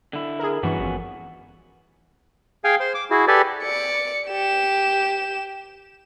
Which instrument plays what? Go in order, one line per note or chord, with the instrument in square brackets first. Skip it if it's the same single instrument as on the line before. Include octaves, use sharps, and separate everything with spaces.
[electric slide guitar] D3 E4
[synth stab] G#4 A#4
[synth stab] G2 E3 [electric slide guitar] B3 C#4 F#4
[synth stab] G#1 F2
[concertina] G#4 F5 G5 G#5
C5 C6
D6
E4 F#4 G#4
G4 A4 B4 D5 G#5
[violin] D5 C#7
G4 E7